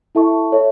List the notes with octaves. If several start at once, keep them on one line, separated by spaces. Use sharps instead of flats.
E4 A4 E5 A5 C#6
A4 C#5 E5